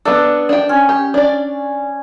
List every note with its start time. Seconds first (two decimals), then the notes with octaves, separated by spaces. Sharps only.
0.05 B3 D4 A4
0.49 D4 G5
0.69 C#4
0.89 G4
1.14 D4 D5